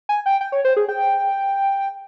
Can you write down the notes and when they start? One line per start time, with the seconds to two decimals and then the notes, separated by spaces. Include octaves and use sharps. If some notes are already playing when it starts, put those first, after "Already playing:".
0.09 G#5
0.26 G5
0.41 G5
0.52 C#5
0.65 C5
0.77 G#4
0.89 G5